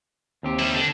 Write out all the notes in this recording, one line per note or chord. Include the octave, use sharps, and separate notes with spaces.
D#2 C4 G4
G3 E4
D3